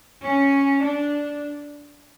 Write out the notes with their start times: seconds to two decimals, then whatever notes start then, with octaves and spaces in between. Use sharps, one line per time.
0.23 C#4
0.84 D4